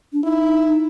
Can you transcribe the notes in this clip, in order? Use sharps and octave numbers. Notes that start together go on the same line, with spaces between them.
D4
D#4 E4